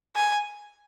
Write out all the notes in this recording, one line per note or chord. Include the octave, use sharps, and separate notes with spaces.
G#5